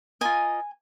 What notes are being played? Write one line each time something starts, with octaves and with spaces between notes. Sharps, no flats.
F4 A#4 D#5 G#5